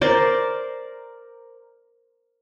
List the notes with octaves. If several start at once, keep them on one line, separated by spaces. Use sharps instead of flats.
A#4 C5 D5